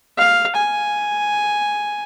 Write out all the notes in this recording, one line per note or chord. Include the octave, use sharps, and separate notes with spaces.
F5
G#5